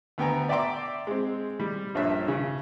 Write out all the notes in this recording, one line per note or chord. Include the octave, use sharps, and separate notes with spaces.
D2 B3 G5 G#5 A#5
D5 E5 G5 A#5 C6 D6
G#3 C4
G3
A#1 G2 C#4 E5
C#3